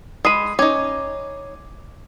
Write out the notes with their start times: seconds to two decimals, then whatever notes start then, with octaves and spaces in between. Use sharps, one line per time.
0.25 G#3 B5 D#6 C7 D#7
0.59 C#4 D#4 D6 G#6